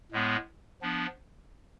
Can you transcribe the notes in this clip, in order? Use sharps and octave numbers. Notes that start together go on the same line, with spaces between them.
A2 G#3 B3
F3 B3 D4